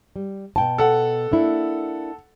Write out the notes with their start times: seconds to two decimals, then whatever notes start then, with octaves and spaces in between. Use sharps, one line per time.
0.16 G3
0.56 B2 G5 A5
0.78 A4 F#5
1.31 A#3 D4 E4